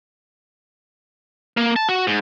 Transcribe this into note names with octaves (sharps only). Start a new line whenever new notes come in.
A#3
A5
F#4
G#2